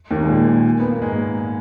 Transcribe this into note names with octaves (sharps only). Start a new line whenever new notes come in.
D#2 D#3
G#3
A#2 A#3
B3
A#3
G#2 G#3